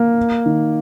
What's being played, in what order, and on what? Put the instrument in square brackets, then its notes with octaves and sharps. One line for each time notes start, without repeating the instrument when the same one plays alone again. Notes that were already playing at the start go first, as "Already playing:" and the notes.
Already playing: [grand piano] A#3
D#3